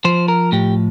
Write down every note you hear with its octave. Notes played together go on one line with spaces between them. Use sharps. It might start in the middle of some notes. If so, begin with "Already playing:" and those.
F3 C5
A#4
A2 G4